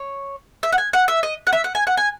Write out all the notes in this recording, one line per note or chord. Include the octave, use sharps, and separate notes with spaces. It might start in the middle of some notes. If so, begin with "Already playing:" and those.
Already playing: C#5
E5
F#5
G#5
F#5
E5
D#5
F#5
E5
F#5
G#5
F#5
G#5